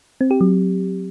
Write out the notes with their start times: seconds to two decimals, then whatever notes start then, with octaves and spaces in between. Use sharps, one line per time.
0.21 C4
0.31 G4
0.41 F#3